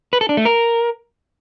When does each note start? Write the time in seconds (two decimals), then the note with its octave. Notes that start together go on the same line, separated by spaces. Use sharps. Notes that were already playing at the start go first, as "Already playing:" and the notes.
0.13 B4
0.21 A4
0.29 D4
0.37 A3
0.45 A#4